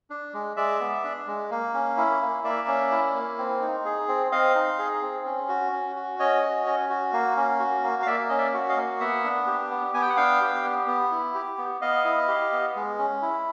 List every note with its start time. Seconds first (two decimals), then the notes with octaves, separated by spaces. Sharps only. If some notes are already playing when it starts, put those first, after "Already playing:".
0.10 D4
0.34 G#3
0.56 G#3 D5 E5
0.80 B3
1.04 D4
1.27 G#3
1.51 A#3
1.74 C#4
1.97 E4
2.21 A#3
2.44 A#3 D5 E5
2.68 C#4
2.91 E4
3.14 A#3
3.38 C4
3.61 D#4
3.85 G#4
4.08 C4
4.32 C4 D#5 F5
4.55 D#4
4.79 G#4
5.02 C4
5.26 C#4
5.49 F#4
5.72 C#4
5.96 F#4
6.19 C#4 C#5 D#5
6.43 F#4
6.66 C#4
6.89 F#4
7.13 A#3
7.37 C#4
7.60 F#4
7.83 A#3
8.02 F5
8.06 A#3 D5 E5
8.29 C#4 D#5
8.38 D5 E5
8.54 F#4
8.69 D#5 F5
8.77 A#3
9.00 B3 E5 F#5
9.24 D4
9.47 G4
9.70 B3
9.94 B3 G#5
10.02 G5
10.09 F#5
10.17 D4 F5 G5
10.41 G4
10.64 B3
10.87 B3
11.11 E4
11.35 G4
11.58 B3
11.82 B3 D#5 F5
12.05 E4
12.28 G4
12.52 B3
12.76 G#3
12.98 C#4
13.22 E4